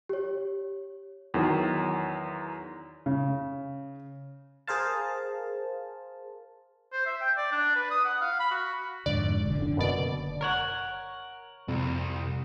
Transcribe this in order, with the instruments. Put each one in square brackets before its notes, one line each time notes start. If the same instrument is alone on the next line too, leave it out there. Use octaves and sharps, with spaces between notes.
[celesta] G4 C#5
[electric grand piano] E2 D#3 F#3
[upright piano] C#3
[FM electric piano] G#4 A#4 C5 F5 A5
[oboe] C5
E5
G5
D5
D4
B4
D#6
F#5
F5
B5
F#4
[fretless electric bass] F2 G#2 D3 [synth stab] D5
[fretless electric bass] E1 D3
F#1 D3 D4
[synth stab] F#2 B2 D5
[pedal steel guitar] A#4 C#5 F#5
[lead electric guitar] C2 [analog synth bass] F2